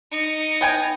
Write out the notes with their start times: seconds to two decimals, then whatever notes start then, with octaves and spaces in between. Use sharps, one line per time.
0.11 D#4 C#7
0.61 B3 G5 G#5